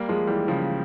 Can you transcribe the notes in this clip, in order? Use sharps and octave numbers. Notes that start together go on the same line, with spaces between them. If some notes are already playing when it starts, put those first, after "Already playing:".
Already playing: G3 A#3
F3 G#3
E3 G3
C#3 F3